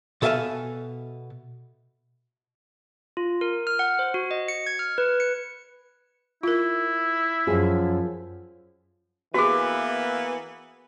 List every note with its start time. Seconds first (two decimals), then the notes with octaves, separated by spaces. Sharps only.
0.22 B2 A4 E5 F5 G#5 A5
3.17 F4
3.41 A#4
3.67 F6
3.79 F#5
3.99 C5
4.14 F#4
4.31 D#5
4.48 C#7
4.67 G#6
4.79 F6
4.98 B4
5.20 C#7
6.43 E4 F4 A#4
7.47 F#2 F3 G#4
9.34 E3 A#3 B3 F#4 G#4